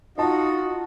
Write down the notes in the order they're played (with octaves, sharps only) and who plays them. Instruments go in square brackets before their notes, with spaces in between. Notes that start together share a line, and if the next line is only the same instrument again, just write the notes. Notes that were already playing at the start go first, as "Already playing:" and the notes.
[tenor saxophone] D#4 [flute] F4 [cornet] F#4 [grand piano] D#5 A5